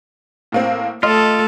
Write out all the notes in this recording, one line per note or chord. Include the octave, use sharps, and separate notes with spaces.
A2 A#3 C4
A3 F4 A4 D#5